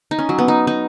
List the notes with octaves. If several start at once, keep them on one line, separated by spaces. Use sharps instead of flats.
D#4
C#4
F#3
B3
D#4
D#4